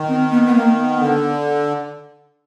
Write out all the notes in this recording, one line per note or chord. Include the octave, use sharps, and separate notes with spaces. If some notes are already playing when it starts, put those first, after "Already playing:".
Already playing: D#3
C4
B3
B3
A#3
B3
D3